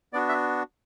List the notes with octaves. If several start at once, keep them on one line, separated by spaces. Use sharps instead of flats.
B3 D4 F#4 D5
E5